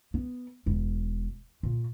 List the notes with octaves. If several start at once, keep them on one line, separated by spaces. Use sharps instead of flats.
B3
E1
A#2